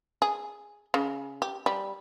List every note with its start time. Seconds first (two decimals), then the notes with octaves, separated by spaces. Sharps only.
0.22 G#4
0.94 C#3
1.42 G4
1.66 G3